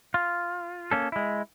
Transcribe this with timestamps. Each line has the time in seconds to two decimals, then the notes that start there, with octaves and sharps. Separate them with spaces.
0.14 F4
0.91 A#3 C#4 A4
1.12 G#3 E4